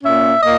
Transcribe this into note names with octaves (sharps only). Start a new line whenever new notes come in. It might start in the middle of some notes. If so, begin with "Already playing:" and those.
A#2 A#3 C#4 E5
A#2 A#3 D#5